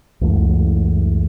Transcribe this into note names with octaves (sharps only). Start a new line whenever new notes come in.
C#2 F#2 E3 A3